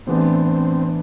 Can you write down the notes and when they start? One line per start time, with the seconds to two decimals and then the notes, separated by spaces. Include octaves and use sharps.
0.07 A2 E3 B3 C4 D4
0.47 C4